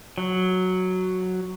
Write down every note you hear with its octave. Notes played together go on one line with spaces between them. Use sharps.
F#3